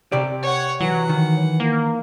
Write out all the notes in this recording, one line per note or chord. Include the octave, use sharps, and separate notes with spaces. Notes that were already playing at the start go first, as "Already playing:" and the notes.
C3 G4 D5
C#5 F#5
E3 F#3 F#5
D#3
A#3